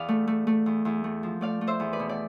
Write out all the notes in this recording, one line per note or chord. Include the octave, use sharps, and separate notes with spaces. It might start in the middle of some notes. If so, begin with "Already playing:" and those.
Already playing: E2 D5 F5
A3
A3
A3
E2
E2
A3
F3
A3 D5 F5
A3
C5 E5
E2
B4 D5
B2
D5